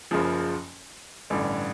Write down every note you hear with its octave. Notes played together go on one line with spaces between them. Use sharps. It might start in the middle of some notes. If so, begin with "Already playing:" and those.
F#1 F#2 C#3 F3
A1 G2 D3